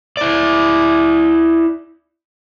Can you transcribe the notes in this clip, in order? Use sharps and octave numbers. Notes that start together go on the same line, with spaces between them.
E4 D5